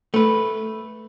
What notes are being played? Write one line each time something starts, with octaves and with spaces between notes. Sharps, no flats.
A3 B4